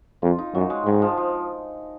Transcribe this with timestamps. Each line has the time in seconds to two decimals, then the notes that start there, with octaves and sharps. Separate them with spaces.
0.22 F2 F4
0.38 D#4
0.55 F#2 F#3
0.70 G#3
0.86 G#2 D#3
1.02 F3
1.17 F3